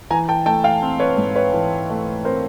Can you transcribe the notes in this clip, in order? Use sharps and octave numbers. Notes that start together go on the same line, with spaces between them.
E3 G#5 A#5
G5 A5
A3 G5 A5
F5 G5
C4
B4 C#5
G#2
B4 C#5
E3
A3
C4 A#4 C5